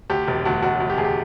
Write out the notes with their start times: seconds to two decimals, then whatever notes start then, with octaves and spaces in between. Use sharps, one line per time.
0.10 D2 G4
0.28 E1
0.45 D2 F#4
0.62 E1 F#4
0.80 D2
0.90 G4
0.98 D2 G#4
1.04 G4